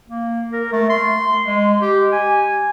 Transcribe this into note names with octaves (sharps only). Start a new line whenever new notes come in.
A#3
A#4
A3
C6
G#3
G4
G#5